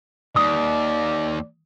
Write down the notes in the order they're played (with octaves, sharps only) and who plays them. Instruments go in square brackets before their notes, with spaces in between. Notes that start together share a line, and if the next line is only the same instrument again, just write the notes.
[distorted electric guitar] D#2 [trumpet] D5 [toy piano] D#6